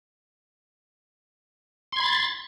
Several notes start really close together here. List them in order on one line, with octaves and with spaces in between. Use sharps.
C6 G#6 B5 A6